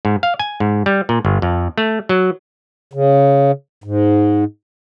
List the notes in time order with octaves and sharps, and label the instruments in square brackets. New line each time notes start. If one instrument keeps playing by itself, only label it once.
[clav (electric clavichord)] G#2
F5
G#5
G#2
G3
A#2
G1
F2
A3
F#3
[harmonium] C#3
G#2